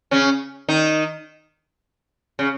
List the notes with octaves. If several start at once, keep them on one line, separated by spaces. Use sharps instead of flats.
C#3 C#4
D#3 D#4
C#3